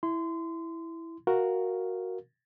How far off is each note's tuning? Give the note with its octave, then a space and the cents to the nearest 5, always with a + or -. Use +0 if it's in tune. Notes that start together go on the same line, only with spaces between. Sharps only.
E4 +0 C6 -25
F#4 +0 A#4 +0 F5 +0